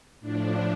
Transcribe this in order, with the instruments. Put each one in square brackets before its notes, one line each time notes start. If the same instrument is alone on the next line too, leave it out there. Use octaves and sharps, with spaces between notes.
[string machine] A2 F3 D4